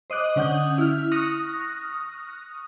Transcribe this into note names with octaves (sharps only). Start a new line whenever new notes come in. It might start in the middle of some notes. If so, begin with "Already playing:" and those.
C5 D#5 D6 F#6
D3 C#4 F#5 D#6 G6
E4 F6
C#6 D#6 F6 F#6 A#6